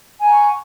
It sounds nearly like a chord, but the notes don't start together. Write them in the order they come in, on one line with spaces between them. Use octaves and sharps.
G#5 A#5 F#5 C#6